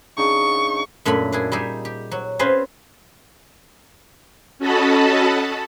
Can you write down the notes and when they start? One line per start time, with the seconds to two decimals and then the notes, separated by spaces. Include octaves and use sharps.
0.17 C#3 D4 D#4 C#6
1.05 F#2 A#2 A3 D4 G#5 B5
1.32 D4 E4 G#4
1.52 G3 D#4 G4 G#4 E5
1.85 G4
2.11 F#3
2.39 C4 C#4 F4 G#4 B4 C5
4.59 C#4 F#4 A4 D#5 A5 B5